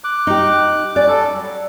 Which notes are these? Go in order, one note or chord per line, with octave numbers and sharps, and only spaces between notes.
D6 F#6
D#4 G4
C#4 D5
G3 A4
F#3